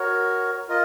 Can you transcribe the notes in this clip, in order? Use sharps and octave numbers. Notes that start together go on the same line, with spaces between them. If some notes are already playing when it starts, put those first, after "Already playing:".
Already playing: F#4 A#4 C#5
F4 A#4 D#5